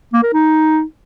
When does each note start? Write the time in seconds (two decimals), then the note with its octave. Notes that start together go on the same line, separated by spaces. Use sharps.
0.13 A#3
0.23 A#4
0.33 D#4